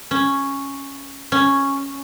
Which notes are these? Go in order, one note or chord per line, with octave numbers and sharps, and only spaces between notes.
C#4
C#4